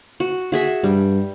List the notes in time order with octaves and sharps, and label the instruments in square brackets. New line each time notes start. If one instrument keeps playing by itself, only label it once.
[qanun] F#4
F#4 G#4 E5
[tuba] G2 [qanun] G3